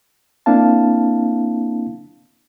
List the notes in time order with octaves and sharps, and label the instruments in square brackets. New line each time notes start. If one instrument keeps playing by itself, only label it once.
[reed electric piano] A#3 C4 D4 E4 F5 A5